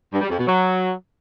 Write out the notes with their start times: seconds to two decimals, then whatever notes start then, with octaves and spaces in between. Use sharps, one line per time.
0.13 G2
0.21 G3
0.30 F2
0.38 B2
0.46 F#3